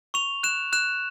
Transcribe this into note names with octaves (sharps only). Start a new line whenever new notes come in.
C#6 F7
F#6 E7
F#6 E7